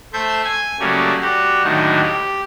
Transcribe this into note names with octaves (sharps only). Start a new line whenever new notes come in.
A3 A4 C5 E5 G6
G#5 G#6
C#3 F#3 G3 A3 A#3 C#4
G3 F#4 G4
D#2 A2 D3 D#3 F#3 A3
G4